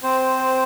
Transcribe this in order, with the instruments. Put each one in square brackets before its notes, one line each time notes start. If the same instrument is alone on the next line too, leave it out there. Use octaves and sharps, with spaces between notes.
[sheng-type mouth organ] C4 C5